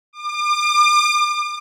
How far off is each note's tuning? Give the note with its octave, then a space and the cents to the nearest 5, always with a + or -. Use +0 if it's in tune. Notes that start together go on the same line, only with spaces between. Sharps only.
D6 +40